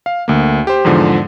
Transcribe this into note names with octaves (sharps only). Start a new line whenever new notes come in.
F5
D2 A#3
G4 C5
E2 G#2 D3 F3